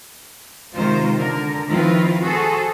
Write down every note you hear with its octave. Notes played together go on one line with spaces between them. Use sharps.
C3 D#3 G#3 F4 C5
D3 A#4
D#3 F3 C4 E4 F4 B4
F#4 G#4 A4 C5